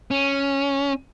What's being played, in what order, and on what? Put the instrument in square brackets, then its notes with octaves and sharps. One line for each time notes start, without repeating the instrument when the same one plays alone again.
[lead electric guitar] C#4